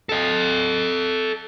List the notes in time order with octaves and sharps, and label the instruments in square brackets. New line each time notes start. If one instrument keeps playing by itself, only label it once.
[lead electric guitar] A4 D#5